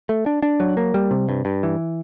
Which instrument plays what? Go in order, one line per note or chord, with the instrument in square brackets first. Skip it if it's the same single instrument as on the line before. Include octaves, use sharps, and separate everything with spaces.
[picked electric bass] A3
D4
D4
F#3
A#3
G3
C3
G2
G2
E3